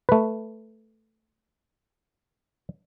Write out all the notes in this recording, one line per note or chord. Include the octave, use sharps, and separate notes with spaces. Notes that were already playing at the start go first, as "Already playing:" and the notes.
A3 B4